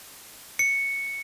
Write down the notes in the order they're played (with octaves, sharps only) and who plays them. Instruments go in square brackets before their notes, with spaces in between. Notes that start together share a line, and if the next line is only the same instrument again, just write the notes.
[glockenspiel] C#7